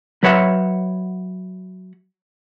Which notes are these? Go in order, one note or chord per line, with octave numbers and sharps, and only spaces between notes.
F#3 B4 C#5 E5 F#5